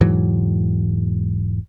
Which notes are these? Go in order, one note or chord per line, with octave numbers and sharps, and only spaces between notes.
E1 G#2 E3 F#3